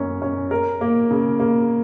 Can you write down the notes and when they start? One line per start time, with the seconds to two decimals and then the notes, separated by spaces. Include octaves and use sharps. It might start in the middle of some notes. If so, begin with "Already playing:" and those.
Already playing: F#2 C#4
0.22 C#4
0.51 A#4
0.81 A#3
1.11 C#3
1.40 A#3